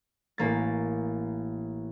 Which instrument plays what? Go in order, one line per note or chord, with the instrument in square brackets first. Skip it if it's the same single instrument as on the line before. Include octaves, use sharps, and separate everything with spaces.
[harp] A1 A#3 A6